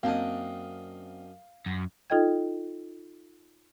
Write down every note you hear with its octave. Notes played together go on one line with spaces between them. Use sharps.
F#2 A#3 C4 D4 D#5 F5
F#2
D#4 F4 A4 D#5 G5 G#6